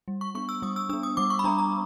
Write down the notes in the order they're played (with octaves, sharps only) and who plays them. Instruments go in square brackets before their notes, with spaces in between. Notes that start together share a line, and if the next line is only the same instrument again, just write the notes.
[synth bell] G3
C#6
B3 D4 C#6
E6
G3 D#6
E6
B3 D4 E6
D#6
G3 D6
C#6
B5
B3 D4 A#5
A#5